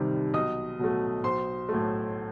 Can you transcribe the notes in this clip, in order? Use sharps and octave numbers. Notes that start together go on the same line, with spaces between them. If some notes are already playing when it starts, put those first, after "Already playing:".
Already playing: C2 C3 D#3 G3
B1 D#5 D#6
B2 F#3 A3
B1 C5 C6
A2 F#3 A3